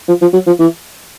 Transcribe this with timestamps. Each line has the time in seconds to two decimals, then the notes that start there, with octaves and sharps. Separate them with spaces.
0.08 F3
0.22 F3
0.33 F#3
0.47 F3
0.59 E3